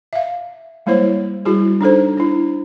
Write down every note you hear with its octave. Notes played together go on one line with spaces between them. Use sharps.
E5 F5
G3 G#3 A#3 E4 C5 C#5
G3 E4 F#4 G#4
D4 D#4 A4 C5
D4 E4